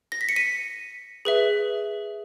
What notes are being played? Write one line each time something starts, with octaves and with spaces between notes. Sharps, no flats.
A#6
B6
C#7
B6 D#7
G#4 B4 E5